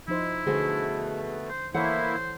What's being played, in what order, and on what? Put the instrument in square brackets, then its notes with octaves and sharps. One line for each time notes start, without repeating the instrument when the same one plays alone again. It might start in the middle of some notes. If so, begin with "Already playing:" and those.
[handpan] F3 D#4 C5 [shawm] E4
[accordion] B2 A3 [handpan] D3 [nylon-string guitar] F#4 G#4 C5
[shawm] C5
[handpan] E3 A4 C#5 [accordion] A#3 E4 [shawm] C5 [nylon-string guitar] F#5